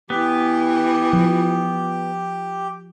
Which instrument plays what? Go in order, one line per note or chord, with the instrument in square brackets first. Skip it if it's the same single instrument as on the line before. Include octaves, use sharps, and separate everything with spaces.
[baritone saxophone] E3 [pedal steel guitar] B3 [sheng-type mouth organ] G4
[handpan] F3